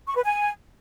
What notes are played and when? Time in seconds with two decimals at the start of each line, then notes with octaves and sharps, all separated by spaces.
0.07 C#6
0.16 B4
0.24 G#5